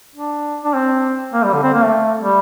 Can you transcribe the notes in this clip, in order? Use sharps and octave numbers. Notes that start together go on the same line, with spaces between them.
D4
D4
C4
A#3
G3
D3
C4
A#3
A3
G3